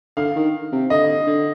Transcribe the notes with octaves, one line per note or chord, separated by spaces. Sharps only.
D3 F5
D#3
C3
D3 D#5
D3